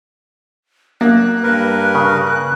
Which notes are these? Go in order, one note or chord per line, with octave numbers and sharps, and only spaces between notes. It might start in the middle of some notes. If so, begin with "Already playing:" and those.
A#3 F#6
G2 A#4 B4
C#3 F#6